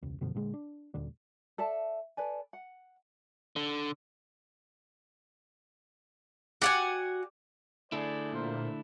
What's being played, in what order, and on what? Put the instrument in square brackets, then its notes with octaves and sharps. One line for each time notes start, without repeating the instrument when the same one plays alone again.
[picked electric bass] E1 C#2
F#2 B2 D3 F3
A#2 D3 F3 G#3
D4
D#1 D2 D3 D4
[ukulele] A4 D5 E5 A5
A4 B4 D5 G#5
F#5
[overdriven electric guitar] D3
[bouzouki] F#4 F#5 G#5 [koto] G4 D5
[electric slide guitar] D3 A3 E4 [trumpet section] G#4 C5 D5
[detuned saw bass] A#2 [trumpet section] F4 A#4 C5